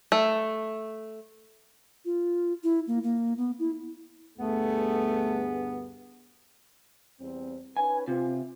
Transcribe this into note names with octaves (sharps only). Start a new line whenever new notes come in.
A3
F4
E4
A#3
A#3
B3
E4
D2 G2 A3 B3 G#4
E2 G3 C4
C#4 D#4 B4 G#5
C3 F4